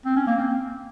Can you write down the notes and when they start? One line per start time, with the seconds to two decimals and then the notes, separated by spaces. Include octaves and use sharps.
0.06 C4
0.16 C#4
0.27 A#3
0.37 C4